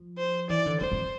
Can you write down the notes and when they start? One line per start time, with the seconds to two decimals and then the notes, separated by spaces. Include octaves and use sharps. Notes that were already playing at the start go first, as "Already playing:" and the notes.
Already playing: F3
0.18 C5
0.49 E3 D5
0.66 D3
0.80 F2 C5
0.92 F2